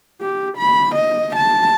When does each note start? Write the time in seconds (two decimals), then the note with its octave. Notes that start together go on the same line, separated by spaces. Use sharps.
0.21 G4
0.58 B5
0.95 D#5
1.36 A5